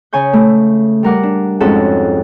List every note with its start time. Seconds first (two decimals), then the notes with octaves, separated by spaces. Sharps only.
0.13 C#3 C#5 G#5 C#6 G6
0.33 A3
1.03 G3 A#4 F#5 D6
1.23 D4
1.60 F2 G#2 C#4 F#4 A4 F#5